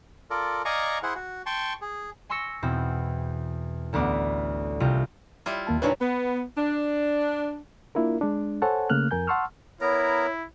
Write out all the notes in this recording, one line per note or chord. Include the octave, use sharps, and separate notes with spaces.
F4 A4 A#4 D5
D5 D#5 F5 G#5 A#5 C#6
E4 G#4 C5 F#5
F#4
G5 A5 C6 C#6
G#4
G#5 C6 C#6 E6 A#6 C#7
E2 B2 C4
A1 D2 B3 D6
C2 C3 F4 D#5 D#7
G3 E4 F4
D#2 A#3 A5
A#2 C#3 F#3 D4 D#4 B4
B3
D4
A#3 D4 E4 F4 A#4
G#3 D4
A4 C5 C#5 F#5 G#5 A5
C#3 A3 A#3 F6 F#6
F2 A#4 G#5 G6
F#5 A5 C6 C#6 E6 F6
B3 E4 A#4 C#5 A#5